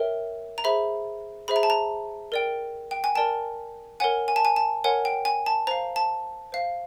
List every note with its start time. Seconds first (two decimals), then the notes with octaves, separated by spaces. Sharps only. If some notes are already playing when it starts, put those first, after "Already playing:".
Already playing: A#4 C#5 E5 G5
0.58 A#5
0.64 G#4 C5 E5 B5
1.48 G#4 C5 E5 B5
1.56 A#5
1.63 A5
1.70 A#5
2.32 A#4 D5 G5
2.91 G5
3.04 G#5
3.15 A#4 D5 G5 A5
4.00 A#4 C#5 F#5 G#5
4.28 G#5
4.36 A5
4.45 G#5
4.56 A5
4.84 A#4 C#5 F#5 G#5
5.05 G5
5.25 G#5
5.46 A5
5.67 C5 F5 A#5
5.96 A5
6.52 C5 F5